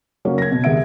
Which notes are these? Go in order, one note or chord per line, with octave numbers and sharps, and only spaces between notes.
C#3 F#3 A#3 C#4
G#6 A#6
B2
D#2 G#3 B3 E5 D7